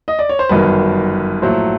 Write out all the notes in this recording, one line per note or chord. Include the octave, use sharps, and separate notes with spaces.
D#5
D5
C#5
C5
G1 F#2 D#3 B4
A#1 A2 F#3 A3 C5